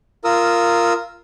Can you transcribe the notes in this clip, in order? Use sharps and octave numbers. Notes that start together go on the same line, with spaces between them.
F4 A#4 D#6 E6